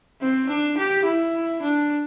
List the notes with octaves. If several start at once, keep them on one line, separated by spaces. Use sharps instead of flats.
C4
D4
G4
E4
D4